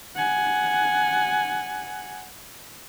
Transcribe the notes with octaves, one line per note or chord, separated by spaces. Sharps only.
F#5 G#5